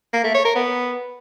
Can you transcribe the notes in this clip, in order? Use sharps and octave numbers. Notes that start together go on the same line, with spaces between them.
A#3
A3
C#5
A#4
B3